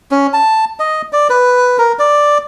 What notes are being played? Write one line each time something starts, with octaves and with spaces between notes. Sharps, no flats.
C#4
A5
D#5
D5
B4
A#4
D5